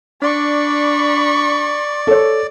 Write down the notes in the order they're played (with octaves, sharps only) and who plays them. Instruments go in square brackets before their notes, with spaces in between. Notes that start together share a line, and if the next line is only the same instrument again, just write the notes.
[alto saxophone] D4 [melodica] D5 [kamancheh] B5 C#6
[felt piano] A4 C#5